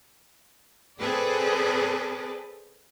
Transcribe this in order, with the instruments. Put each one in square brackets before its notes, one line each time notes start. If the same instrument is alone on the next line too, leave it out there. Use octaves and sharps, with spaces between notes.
[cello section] C4 G#4 A4 B4 D5